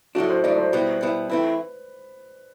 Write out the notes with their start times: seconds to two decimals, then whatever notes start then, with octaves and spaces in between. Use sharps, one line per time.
0.15 A2 F#3 A3 D4 F#4
0.30 C5
0.44 A2 F#3 A3 D4 D5
0.58 C5
0.73 B2 G3 B3 E4
1.01 B2 G3 B3 E4
1.30 E3 A3 C4 E4 B4